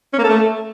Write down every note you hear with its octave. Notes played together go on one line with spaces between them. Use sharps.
C#4
A#3
A4
A3